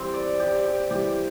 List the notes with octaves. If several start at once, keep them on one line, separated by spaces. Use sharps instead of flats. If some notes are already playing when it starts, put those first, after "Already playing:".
Already playing: E3 G3 C4 G4
D5
G4
G4
E3 G3 G4